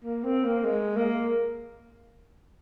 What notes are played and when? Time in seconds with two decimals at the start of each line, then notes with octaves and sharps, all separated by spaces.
0.04 A#3
0.24 C4
0.44 A#3
0.64 G#3
0.96 A#3